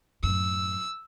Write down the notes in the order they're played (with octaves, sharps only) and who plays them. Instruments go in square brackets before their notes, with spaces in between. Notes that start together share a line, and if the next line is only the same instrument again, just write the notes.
[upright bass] F#2 A2 [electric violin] E6